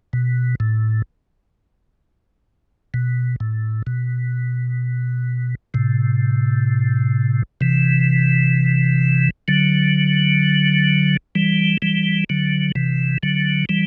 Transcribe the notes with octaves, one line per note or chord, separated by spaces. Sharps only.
B2
A2
B2
A2
B2
A2 C3
C3 E3
D3 F#3
E3 G3
E3 G3
D3 F#3
C3 E3
D3 F#3
E3 G3